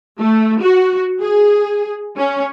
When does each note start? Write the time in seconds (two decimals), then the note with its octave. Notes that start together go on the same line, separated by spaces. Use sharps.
0.19 A3
0.60 F#4
1.20 G#4
2.17 C#4